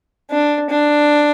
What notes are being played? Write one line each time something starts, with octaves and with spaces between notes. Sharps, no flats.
D4
D4